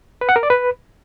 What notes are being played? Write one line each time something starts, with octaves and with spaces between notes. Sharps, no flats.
B4
F#5
A#4
D5
B4